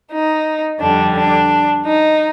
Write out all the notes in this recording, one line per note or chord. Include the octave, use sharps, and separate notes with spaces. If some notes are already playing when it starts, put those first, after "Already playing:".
D#4
F2 D3 G3 D4
D4
D#4